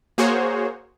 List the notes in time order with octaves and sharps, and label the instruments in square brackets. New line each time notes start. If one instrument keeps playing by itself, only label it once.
[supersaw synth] A#3 F#4 G#4 C5 C#5